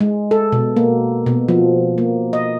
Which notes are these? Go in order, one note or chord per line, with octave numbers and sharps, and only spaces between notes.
G#3
A4
B2
A#3
B2
F3
A#3
D#5